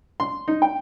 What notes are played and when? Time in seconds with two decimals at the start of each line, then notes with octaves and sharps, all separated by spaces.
0.20 C6
0.48 D#4
0.62 G5